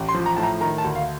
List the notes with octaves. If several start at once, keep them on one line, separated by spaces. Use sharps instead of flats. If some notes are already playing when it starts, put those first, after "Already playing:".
Already playing: A1
C6
F3
A#5
A2 A5
A#5
D#3 A#5
A5
D2
F5